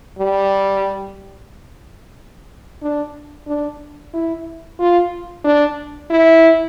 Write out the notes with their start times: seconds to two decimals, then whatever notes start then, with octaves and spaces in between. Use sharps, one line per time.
0.18 G3
2.82 D4
3.47 D4
4.14 E4
4.79 F4
5.44 D4
6.10 E4